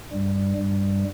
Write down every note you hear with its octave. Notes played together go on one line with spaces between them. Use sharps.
G2 G3
G2 G3